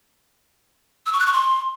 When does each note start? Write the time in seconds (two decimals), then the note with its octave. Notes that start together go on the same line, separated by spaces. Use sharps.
1.06 E6
1.13 C#6
1.20 F#6
1.26 C#6
1.33 C6